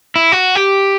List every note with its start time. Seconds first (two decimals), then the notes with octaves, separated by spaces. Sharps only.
0.16 E4
0.32 F#4
0.55 G4